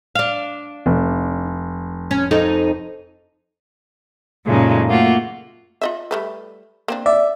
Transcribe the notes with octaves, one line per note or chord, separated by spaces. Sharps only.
D4 F5
F1
C#4
F2 D#4 A4
F#2 A#2 C#3 G#3 A3 D#4
A3 A#3 F4 F#4
F4 D#5 E5
G3 A3 B4
A#3 C4 D4
D5 E5